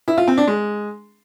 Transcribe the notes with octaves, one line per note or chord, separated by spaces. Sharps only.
E4
F4
C4
D4
G#3